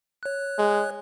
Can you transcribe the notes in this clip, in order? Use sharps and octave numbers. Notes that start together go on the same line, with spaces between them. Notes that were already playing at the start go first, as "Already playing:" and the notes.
C#5 F#6
G#3